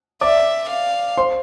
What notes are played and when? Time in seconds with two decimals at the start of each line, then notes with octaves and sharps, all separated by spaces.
0.21 D5 E5 D6
0.70 F5
1.17 C5 C6